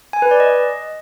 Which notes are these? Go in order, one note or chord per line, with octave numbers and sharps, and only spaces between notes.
G#5
B4
D5
D#5